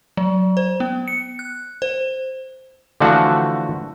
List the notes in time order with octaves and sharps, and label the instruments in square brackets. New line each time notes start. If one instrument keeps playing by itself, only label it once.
[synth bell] F#3
C5
B3
C#7
F#6
C5
[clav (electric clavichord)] D3 E3 F3 A3 D4 F#4